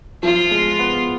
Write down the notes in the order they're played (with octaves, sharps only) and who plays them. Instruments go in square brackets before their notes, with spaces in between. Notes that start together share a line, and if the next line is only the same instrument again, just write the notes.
[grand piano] F3 [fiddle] F4
[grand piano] G#3
B3